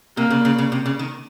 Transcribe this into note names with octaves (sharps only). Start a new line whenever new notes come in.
C3 A#3
C#3
C#3
C#3
C3
C#3
D#3